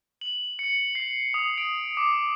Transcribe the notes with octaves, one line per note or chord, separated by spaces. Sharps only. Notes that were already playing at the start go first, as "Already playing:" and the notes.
F#7
C#7
C7
D#6
D7
D6